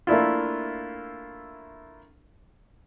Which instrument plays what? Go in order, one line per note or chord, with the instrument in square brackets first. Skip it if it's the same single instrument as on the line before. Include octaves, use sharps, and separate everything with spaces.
[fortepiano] A3 A#3 D4 E4 F4